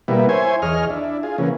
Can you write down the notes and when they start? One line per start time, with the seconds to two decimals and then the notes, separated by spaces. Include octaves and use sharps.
0.08 B2 G3 A#3 B3 E4
0.29 E4 C5 C#5 G#5
0.62 E2 G#4 C#5 D#5 F6
0.90 D4 E4
1.23 F4 G#4
1.38 C#3 E3 A#3 B3 C#4